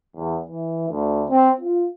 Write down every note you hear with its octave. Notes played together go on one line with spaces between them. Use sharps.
E2
E3
D2
C4
F4